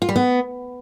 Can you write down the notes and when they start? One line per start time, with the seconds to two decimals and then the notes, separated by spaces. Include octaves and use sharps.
0.02 F4
0.09 G3
0.16 B3